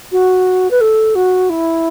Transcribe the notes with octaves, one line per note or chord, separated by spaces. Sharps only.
F#4
B4
A4
F#4
E4